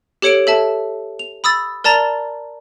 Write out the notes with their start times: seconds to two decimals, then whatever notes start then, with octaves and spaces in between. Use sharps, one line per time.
0.22 G4 A4 C#5 C#7 D7 F#7
0.47 A4 E5 A5
1.19 F7
1.44 B5 D#6 E6 A6
1.84 A#4 D5 A5 A#5 A6